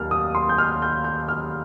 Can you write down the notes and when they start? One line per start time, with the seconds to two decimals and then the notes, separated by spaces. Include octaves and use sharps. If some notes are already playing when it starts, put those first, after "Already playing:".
Already playing: D#2 F6
0.11 D#6
0.35 C6
0.49 G6
0.58 F6
0.82 G6
1.04 G6
1.29 F6